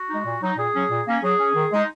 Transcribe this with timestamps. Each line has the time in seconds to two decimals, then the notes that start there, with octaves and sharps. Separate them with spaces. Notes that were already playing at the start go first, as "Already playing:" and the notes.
Already playing: F#4
0.09 G#3 D#4
0.26 A#2
0.42 F#3 D#4
0.58 A#2 G#4
0.75 F#3 C#4
0.90 A#2
1.08 A#3 C#4
1.23 F#3 G#4
1.40 C#4
1.55 D#3
1.72 G#3 D#4